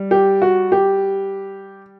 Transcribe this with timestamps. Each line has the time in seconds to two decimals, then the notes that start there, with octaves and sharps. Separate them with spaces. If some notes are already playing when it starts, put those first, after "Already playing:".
Already playing: G3
0.11 G4
0.42 F#4
0.72 G4